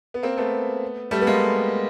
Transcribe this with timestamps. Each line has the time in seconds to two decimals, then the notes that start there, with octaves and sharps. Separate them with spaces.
0.14 B3
0.23 A#3 C4
0.37 A3 B3
1.11 G3 A3
1.21 B3
1.27 G#3 A#3